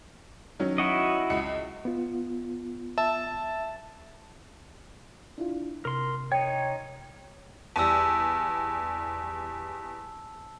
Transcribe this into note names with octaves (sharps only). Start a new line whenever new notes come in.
D#3 F#3 C#4
E4 F#4 D#5
C#2 C#7
B3 F4
E5 A5
D4 E4 F4
C3 A#4 C6
D#4 C#5 G5
E2 G3 A5 E6